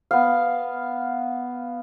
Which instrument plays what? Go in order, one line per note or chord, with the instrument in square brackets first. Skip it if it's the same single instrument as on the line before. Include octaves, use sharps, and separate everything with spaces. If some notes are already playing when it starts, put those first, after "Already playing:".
[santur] B3 F5